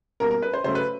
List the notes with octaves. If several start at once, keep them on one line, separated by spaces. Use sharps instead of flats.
B2 G3 A#3 A#4
A#4
B4
C5
C#3 F#3 A3 C5
B4